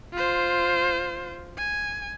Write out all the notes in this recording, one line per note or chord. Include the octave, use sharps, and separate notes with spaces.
F4 C5
G#5